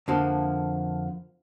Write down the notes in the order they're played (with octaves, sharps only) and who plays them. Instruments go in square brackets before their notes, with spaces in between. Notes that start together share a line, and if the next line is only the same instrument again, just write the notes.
[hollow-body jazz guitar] F2 D3 F3 A#3